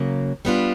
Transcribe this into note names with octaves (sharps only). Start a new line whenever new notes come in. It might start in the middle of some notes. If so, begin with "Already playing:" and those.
Already playing: C#3 F#3 A#3
G3 B3 D4 F4